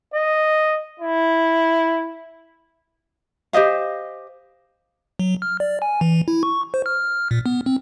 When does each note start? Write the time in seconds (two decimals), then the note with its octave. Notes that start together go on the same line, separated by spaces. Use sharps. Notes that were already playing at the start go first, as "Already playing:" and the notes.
0.14 D#5
1.00 E4
3.53 G4 C5 D#5 F5
5.19 F#3
5.42 F6
5.60 D5
5.82 G#5
6.01 E3
6.28 E4
6.43 C#6
6.74 C5
6.86 F6
7.31 A#2
7.46 B3
7.66 C4